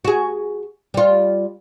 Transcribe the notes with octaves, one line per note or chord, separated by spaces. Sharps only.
F#4 G#4
G3 F4